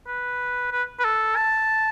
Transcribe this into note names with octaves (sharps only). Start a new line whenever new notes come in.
B4
B4
B4
A4
A5